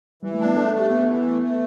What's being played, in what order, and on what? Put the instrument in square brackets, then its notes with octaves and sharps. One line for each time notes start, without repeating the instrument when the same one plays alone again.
[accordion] E3 [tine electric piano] G3
[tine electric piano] A3
[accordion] D4
[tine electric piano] B3
[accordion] A3 [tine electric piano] A4
[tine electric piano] A4
[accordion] A3
[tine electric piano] G4
[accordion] E3 [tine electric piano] B3
[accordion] E3
A3
A3